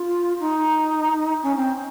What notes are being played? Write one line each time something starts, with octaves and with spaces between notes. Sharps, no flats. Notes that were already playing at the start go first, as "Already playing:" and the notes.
Already playing: F4
D#4
C#4
C4